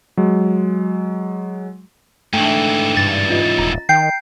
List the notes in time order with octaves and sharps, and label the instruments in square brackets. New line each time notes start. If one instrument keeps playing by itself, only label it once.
[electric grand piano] F#3 G#3
[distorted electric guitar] G#2 E3 [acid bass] A3 [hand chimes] D4 G5
[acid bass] G2 [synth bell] A6
[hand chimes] C#4 F4 D#5
[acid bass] D#1 [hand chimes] A#5
[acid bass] D#3 [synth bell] G5 G6 C7